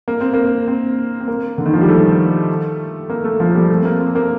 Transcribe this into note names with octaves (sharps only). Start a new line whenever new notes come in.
A#3
C4
A#3
C4
C4
A#3
D3
D#3
F3
G3
A3
A#3
A3
F3
A3
G3
A3
C4
A#3
C4
A#3